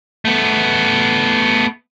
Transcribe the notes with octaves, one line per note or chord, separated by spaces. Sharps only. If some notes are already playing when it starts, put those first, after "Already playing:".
A3 B3